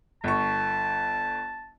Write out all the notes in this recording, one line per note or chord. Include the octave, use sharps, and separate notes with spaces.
G1 A5 C#6